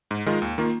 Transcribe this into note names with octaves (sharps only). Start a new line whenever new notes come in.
G#2
D#3 G#3 F4
D#2
D#3 A#3 F4